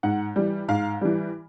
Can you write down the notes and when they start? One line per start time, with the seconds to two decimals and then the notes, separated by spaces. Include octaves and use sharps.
0.03 G#2 F#5
0.36 E3 G3
0.68 G#2 F5
1.01 E3 G3